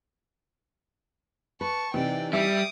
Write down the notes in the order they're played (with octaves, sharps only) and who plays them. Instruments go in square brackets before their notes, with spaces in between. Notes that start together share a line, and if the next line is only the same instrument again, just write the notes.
[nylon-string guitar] B4 [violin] A5 C#6
[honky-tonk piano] C3 [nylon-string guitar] E3 D#4 [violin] D5 G5
[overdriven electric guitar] G3 [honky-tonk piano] E5 [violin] D6 D#6